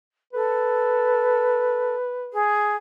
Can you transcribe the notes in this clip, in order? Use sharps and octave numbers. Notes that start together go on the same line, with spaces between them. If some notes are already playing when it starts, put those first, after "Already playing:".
A4 B4
G#4